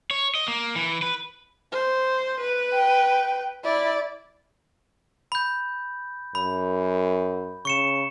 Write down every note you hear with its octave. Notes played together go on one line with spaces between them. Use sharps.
C#5
D#5
A#3
E3
B4
C5
B4
G5
E4 D5
B5 G6
F#2 B5
C#3 C#6 C#7 E7